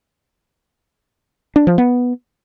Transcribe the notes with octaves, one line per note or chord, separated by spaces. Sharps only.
D4
F3
B3